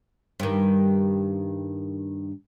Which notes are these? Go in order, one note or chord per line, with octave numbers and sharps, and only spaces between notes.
G2 D#3